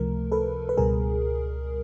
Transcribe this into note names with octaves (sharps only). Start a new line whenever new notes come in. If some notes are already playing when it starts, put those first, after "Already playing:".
Already playing: C#2 C3 F3 A3 A#4
A4 B4
B4
C#2 B2 G3 G#4 A#4